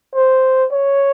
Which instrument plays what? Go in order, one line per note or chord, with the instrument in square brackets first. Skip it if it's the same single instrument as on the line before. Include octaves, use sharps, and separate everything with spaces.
[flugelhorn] C5
C#5